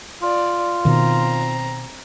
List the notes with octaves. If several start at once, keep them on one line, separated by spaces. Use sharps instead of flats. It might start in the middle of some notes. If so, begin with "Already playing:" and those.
F4 D5
B2 D#3 C4 A#5